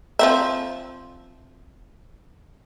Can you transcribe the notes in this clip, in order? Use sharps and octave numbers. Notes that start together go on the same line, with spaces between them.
F3 C4 E5